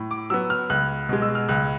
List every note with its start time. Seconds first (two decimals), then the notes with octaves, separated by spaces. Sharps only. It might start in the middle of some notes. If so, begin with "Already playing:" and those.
Already playing: A2
0.11 D6
0.30 F#3 B3 E6
0.50 F6
0.70 C#2 F#6
1.09 B2 G#3
1.22 E6
1.35 F6
1.49 C#2 F#6